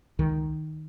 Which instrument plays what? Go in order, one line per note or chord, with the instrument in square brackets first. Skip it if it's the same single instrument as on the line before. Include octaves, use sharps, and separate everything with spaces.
[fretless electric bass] C#2 D#3